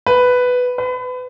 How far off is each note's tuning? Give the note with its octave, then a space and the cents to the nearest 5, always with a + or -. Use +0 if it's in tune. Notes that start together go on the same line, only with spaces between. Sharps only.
B4 +5
B4 +30